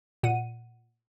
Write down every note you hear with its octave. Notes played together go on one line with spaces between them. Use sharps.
A#2 F#5 D#7